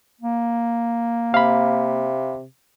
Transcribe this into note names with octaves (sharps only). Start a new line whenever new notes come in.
A#3
C3 F5 B5